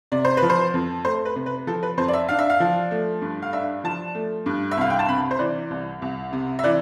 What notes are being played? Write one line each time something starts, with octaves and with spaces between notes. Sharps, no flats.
C3 D5
C5
B4
F3
C5
F2
A3 C5
B4
C3
B4
F3 A4
B4
F2 C5
D5
E5
D4 F5
E5
F5
F3
A3
G2
F5
D4 E5
F3 A5
A3
G2
E5
C2 F5
G5
A5
C3 B5
C5
E3 D5
C2
C2
C3
E5
E3 D5